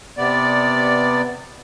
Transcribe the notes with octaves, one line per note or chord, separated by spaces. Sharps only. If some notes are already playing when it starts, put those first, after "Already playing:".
C3 B3 D5